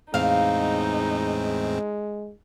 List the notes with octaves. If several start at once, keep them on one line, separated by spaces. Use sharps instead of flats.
E2 A2 G#3 C4 D#4 F5